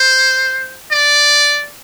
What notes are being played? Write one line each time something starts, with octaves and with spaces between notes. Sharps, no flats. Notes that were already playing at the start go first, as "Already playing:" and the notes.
Already playing: C5
D5